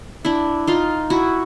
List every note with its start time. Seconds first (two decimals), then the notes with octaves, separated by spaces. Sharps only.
0.25 D4 E4
0.67 D#4 F4
1.10 E4 F#4